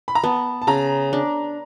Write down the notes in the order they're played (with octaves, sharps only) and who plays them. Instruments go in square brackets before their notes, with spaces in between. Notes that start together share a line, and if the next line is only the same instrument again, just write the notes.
[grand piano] B5
A#5
[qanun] B3 [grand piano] A5
[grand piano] A5
[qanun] C#3 [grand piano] A#5
[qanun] D4